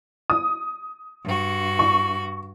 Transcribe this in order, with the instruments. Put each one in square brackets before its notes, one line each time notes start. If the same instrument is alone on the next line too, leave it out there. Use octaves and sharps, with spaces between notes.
[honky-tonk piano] D#6
[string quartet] G2 F#4
[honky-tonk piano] C#6